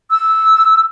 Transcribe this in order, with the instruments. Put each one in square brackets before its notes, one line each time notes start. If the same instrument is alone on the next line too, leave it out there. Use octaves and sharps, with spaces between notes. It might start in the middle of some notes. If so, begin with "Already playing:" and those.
[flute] E6